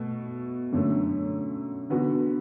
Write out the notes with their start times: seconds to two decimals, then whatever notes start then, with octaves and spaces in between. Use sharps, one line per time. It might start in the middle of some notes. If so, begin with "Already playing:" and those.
Already playing: B2 A3
0.72 F#2 D3 A3
1.90 D3 B3 F#4